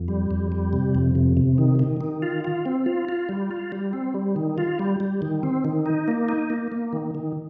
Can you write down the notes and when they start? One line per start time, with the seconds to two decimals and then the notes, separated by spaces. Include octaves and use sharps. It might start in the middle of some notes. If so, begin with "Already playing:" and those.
Already playing: F2
0.08 G3
0.31 F2
0.52 G3
0.73 C3
0.95 F2
1.15 C3
1.37 C3
1.58 D#3
1.79 D#3
2.01 D#3
2.22 F4
2.44 F4
2.66 C4
2.86 F4
3.09 F4
3.29 G3
3.51 F4
3.72 G3
3.93 C4
4.14 G3
4.36 D#3
4.58 F4
4.79 G3
5.00 G3
5.22 D#3
5.43 C4
5.65 D#3
5.86 D#4
6.08 A#3
6.29 D#4
6.50 A#3
6.72 A#3
6.93 D#3
7.15 D#3